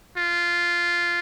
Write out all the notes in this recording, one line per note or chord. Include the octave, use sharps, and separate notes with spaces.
F4